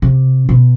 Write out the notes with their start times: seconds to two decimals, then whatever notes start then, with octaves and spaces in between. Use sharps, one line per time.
0.02 C3
0.49 B2